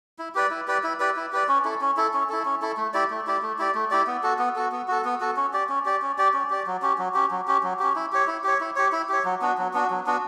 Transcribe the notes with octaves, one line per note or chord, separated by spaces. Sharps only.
E4
G4 B4 D5
E4
G4 B4 D5
E4
G4 B4 D5
E4
G4 B4 D5
C#4
E4 A4
C#4
E4 A4
C#4
E4 A4
C#4
E4 A4
A3
E4 G4 D5
A3
E4 G4 D5
A3
E4 G4 D5
A3
E4 G4 D5
B3
F#4 A4
B3
F#4 A4
B3
F#4 A4
B3
F#4 A4
C#4
G4 D5
C#4
G4 D5
C#4
G4 D5
C#4
G4 D5
F#3
C#4 G4
F#3
C#4 G4
F#3
C#4 G4
F#3
C#4 G4
E4
G4 C#5
E4
G4 C#5
E4
G4 C#5
E4
G4 C#5
F#3
B3 D4 F#4
F#3
B3 D4 F#4
F#3
B3 D4 F#4